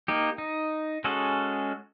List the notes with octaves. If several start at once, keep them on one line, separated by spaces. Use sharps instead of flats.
A#3 D#4 G4
D#4
G#3 C#4 F#4 G#4 A4